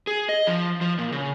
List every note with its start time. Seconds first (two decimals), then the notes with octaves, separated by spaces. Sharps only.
0.07 G#4
0.29 D#5
0.47 F3
0.81 F3
0.98 A#2
1.12 C#3